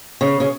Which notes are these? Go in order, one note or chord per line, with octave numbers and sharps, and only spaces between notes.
C#3
C#3